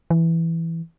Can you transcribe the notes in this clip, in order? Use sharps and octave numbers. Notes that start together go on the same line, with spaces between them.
E3